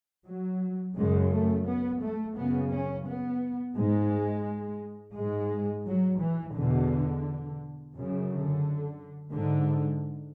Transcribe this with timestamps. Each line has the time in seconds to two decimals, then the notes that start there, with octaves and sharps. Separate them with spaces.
0.26 F#3
0.96 F#2 C#3 G#3
1.31 A3
1.66 B3
2.01 A3
2.36 F#2 C#3 B3
2.71 C#4
3.06 B3
3.75 G#2 G#3
5.14 G#2 G#3
5.85 F#3
6.19 E3
6.54 E2 B2 D3
7.93 F#2
7.98 C#3
8.28 D3
9.33 G#2 D3